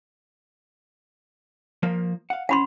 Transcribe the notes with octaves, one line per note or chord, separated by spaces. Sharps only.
F3 A#3 A#4
F5 F#5
C#4 C5 F#5 B5 C6